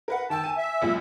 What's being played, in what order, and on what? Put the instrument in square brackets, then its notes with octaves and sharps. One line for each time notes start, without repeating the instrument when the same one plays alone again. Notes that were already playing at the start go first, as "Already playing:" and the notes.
[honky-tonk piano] A#4 B4 F#5
[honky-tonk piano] D#3 G5 E6 [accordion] A5
[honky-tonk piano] G#5 D#7
[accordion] E5
[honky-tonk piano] C#2 F#2 A#2